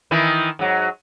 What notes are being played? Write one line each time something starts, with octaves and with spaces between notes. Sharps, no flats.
D#3 E3 E4
G#2 F#3